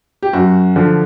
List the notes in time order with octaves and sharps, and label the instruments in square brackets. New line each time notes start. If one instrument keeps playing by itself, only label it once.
[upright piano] G4
F#2 F#4
D3 F3